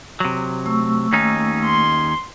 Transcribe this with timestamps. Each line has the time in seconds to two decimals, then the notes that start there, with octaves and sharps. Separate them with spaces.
0.20 C3 F#3
0.66 A3 C#6 E6
1.13 D#2 C#4 D#4
1.65 C6